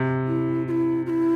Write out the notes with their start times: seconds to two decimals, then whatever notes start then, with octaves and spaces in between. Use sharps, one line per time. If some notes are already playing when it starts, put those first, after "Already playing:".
Already playing: C3
0.27 E4
0.68 F4
0.71 E4
1.06 F4
1.10 E4